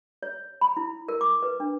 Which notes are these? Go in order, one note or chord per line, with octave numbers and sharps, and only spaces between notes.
C#5
B5
E4
A#4
D6
B4
D4